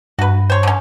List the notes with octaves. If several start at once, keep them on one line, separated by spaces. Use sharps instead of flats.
G2 F#4 B4
C5 C#5
D3 C#4